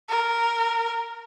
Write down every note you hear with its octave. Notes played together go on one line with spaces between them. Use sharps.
A#4